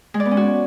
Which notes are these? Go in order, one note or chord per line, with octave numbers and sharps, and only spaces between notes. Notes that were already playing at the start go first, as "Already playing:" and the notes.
G#3
D5
B3
C#4
F#4